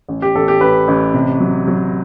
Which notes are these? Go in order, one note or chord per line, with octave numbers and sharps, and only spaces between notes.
A1
G4
A1 A4
G4
A1 B4
A1
C3
F#3
F#3